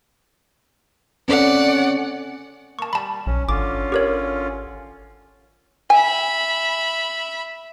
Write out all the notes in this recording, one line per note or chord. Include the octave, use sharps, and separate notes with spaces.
C4 C#4 A4 D5 F#5
A#3 A5 C#6
G3 A5 B5
B1 C#4
G#1 D3 C#4 F4 D6
G4 A#4 C#5
E5 G#5 B5